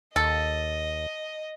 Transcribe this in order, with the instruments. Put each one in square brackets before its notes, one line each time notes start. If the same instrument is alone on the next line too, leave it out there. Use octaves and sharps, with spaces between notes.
[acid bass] D#2 [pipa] A4 [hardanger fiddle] D#5